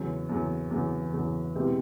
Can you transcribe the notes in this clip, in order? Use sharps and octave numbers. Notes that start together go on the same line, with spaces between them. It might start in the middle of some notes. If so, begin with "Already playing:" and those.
Already playing: E2 C#3 F#3
E2 C#3 F#3
E2 C#3 F#3
E2 C#3 F#3
B2 G#3 C4 E4 G4